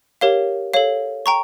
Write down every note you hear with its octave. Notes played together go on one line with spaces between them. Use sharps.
G4 A#4 C#5 F5
A4 C#5 F5
G5 A#5 C#6